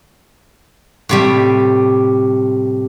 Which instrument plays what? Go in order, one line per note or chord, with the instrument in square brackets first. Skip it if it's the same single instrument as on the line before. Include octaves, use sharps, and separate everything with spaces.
[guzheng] A2 C3 G3